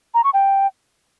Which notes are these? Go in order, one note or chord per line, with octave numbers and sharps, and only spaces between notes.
A#5
C#6
G5